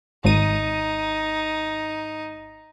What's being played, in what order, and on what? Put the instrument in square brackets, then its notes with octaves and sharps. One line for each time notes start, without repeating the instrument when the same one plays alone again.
[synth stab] G#1 D#7 [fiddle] D#4